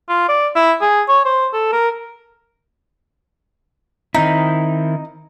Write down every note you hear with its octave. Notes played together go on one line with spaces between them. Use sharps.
F4
D5
E4
G#4
C#5
C5
A4
A#4
D#3 C4 D#4 E4